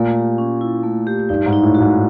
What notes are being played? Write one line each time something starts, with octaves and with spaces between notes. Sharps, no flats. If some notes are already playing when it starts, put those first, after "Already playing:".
Already playing: A#2 A3
G4
C#4
E4
A3
G4
G2 D#4
G#2
D#4
A2
F#4
G#2